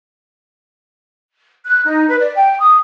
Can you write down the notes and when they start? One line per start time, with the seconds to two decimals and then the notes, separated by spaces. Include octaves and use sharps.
1.65 F#6
1.85 D#4
2.08 B4
2.19 D5
2.35 G5
2.60 D#6